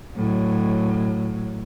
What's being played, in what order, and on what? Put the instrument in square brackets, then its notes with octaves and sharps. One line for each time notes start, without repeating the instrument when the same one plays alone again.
[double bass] A2 F#3